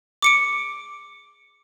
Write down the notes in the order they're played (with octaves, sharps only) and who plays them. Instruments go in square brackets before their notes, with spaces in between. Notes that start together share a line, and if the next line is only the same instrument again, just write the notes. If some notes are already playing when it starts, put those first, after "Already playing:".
[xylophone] D6 C#7 D7